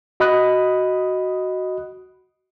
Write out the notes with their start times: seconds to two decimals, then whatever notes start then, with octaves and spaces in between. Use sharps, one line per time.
0.20 F#4 D#5 B5 D#6 F#6